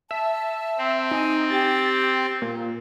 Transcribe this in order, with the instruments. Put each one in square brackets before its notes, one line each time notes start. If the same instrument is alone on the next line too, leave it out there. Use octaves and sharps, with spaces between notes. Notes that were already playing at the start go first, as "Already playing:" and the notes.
[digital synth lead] E5 [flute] A5
[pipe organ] C4
[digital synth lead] D#4 [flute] G#5
[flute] G4 [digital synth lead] A6
[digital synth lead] A#2